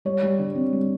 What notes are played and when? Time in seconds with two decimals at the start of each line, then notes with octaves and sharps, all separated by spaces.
0.05 G3 C#5
0.23 G3
0.39 D3
0.55 C4
0.73 G3